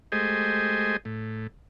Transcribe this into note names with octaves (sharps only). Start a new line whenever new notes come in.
G#3 A3 G4 C5 D#5 G#5
A2